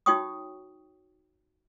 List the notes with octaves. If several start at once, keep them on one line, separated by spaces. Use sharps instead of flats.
D#4 F#4 C#5 G5 C#6 D#6